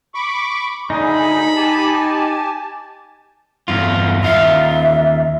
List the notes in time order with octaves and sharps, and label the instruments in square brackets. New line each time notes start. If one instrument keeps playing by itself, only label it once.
[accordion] B5 C#6 D6
[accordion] D2 D3 G#4 [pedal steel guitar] D#4 [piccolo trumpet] B5
[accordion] G4 G#5 A5
[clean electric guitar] E2 G2 F4
[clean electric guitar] D#2 F4 F5 [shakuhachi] E5